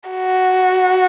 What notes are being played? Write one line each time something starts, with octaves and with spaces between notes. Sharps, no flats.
F#4